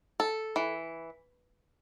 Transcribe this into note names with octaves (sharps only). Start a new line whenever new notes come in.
A4
E3